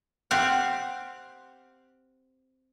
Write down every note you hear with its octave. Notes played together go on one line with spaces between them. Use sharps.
C4 G4 F5 F#5